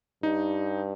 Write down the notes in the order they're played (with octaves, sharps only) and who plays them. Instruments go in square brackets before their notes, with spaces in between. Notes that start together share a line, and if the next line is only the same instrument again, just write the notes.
[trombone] G2 [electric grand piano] D#4